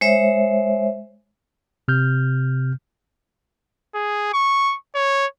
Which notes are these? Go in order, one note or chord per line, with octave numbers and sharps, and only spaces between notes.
G#3 C5 C#5 E5
C3 F6 G6
G#4
C#6
C#5